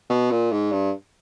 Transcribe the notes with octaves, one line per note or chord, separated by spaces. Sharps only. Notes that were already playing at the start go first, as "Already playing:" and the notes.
B2
A#2
G#2
G2